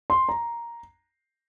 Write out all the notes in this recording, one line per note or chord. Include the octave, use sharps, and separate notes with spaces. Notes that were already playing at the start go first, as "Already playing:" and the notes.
C6
A#5